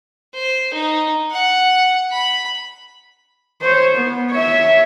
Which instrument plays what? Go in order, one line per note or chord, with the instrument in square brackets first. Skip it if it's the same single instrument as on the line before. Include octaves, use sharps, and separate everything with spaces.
[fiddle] C5
D#4
F#5
B5
[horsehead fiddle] C5 C#5
B3
C#5 E5